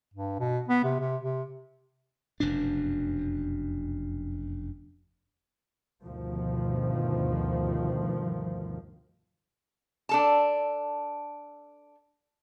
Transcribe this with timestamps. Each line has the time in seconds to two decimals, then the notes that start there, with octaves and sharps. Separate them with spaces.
0.14 G2
0.39 B2
0.68 B3
0.84 C3
1.00 C3
1.23 C3
2.40 F1 F#2 B2 D4
6.04 D2 G2 B2 D#3 F3
10.09 D4 A4 A5